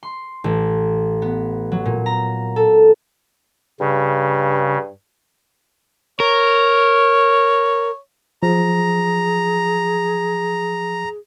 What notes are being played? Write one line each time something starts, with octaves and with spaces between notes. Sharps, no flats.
C6
A1
B3
F#3
A#2
A#5
A4
G2 C#3
A#4 C#5
F3 G#4 A#5